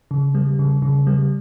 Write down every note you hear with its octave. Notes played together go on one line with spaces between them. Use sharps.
C#3
G3
C#3
C#3
G3